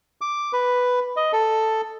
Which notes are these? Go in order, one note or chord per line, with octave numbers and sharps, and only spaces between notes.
D6
B4
D#5
A4